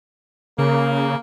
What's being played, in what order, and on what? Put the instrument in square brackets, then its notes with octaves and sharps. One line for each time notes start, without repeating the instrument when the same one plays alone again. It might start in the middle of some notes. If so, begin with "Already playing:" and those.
[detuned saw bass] C#3 [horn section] A#3